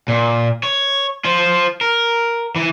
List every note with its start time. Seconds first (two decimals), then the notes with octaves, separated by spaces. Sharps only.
0.08 A#2
0.63 C#5
1.25 F4 C5
1.81 A#4
2.56 E3